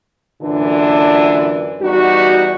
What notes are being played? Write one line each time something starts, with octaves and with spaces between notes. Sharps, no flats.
F#2 A#2 D3 E3 D4
E2 G3 D#4 F#4